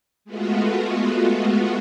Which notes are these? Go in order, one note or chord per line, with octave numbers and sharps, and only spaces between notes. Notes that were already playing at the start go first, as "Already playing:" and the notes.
G#3 A3 B3 F4 F#4